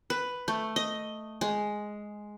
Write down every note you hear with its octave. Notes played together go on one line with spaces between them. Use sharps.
B4
A3
D#5
G#3